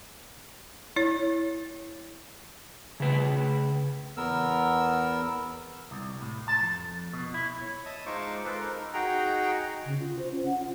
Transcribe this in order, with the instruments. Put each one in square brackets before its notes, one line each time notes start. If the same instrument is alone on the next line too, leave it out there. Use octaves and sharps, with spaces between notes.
[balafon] E4 C#5
[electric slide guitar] C#3 B4
[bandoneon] E2 B3 A#4 E6
[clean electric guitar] C2
A2
A5
F2
B2
E4
[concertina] C#5
D#5 E5 A5 D#6
G#3 D#4 F4 C5 C#6 D6
G#3 F4 A4 B4 C5 D6
D#4 A#4
D#4 F#4 G#4 G5 A#5
[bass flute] C#3
F4
C5
C#4
F#5
F4